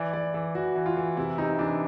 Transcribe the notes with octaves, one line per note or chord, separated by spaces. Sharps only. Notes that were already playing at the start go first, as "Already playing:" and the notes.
Already playing: E3 D5
E3 D5
E3
E3 F#4
E3
F4
E3
C3 E4
C3 D#4
E3 D4